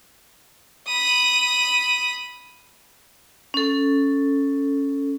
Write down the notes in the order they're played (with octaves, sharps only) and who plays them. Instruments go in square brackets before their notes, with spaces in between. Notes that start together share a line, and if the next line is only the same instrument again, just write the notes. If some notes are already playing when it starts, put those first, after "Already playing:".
[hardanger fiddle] B5 D#6
[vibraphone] C#4 A4